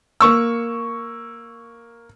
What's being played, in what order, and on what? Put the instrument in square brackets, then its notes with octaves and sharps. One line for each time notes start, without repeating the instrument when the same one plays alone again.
[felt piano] A#3 C#6 E6